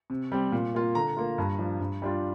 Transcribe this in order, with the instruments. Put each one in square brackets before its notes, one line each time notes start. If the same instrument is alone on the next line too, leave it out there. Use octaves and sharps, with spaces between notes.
[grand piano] C3
G3 C4
A#2
A#3 F4
D3 A#5
A#3 F4
G2
F3 D4
G2
G3 D4 F4